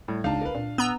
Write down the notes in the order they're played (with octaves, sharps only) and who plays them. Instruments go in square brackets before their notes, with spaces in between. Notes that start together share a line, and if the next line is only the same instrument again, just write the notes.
[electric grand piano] A2 [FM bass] G3
[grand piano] C#2 D4 A5 [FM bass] D#4 [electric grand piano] F5
[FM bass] C2 [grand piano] A#4 B4
[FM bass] A#2 [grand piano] D4
[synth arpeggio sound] B3 A#5 E6